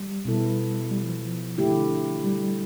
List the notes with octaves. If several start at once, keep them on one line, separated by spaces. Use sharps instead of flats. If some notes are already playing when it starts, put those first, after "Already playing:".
Already playing: G3
B2 B3 E4 A4
G3
F3
F3
D3 A3 E4 G4
G3